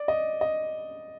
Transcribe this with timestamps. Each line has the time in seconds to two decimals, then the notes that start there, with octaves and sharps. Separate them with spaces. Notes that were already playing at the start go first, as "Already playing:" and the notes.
Already playing: D5
0.08 D#5
0.41 D#5